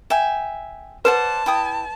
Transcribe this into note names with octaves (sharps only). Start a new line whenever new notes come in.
E5 G5 G#5
B4 C5 D5 F#5 A5
E4 G5 D#6